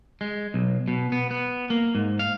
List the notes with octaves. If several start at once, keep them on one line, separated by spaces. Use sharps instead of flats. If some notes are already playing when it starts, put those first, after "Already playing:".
G#3
B1
B2
B3
B3
A#3
G#2
F5